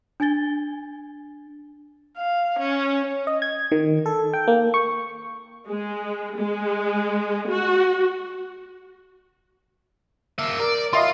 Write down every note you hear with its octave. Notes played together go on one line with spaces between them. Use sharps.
D4 G#5 G#6 A6 G7
F5
C#4
D#5
G#6
D#3
A4
G5
A#3
C#6
G#3
G#3
F#4
A#3 E5
A#4 D5
F4 D#5 E5 C6